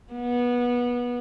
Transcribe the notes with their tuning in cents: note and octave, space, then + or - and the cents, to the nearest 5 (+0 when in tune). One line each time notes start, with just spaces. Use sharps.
B3 -20